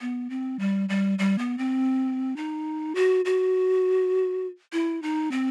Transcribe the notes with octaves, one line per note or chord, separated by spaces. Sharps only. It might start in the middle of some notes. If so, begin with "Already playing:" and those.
B3
C4
G3
G3
G3
B3
C4
D#4
F#4
F#4
E4
D#4
C4